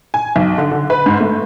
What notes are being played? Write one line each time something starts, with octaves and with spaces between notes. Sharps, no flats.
G#5
B1
D3
D3
B4
G#2
A3